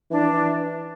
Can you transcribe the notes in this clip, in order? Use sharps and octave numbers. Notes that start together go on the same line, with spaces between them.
E3 D4
E3